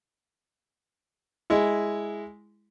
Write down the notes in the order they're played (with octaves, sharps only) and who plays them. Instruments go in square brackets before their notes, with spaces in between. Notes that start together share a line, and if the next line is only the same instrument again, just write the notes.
[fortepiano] G#3 E4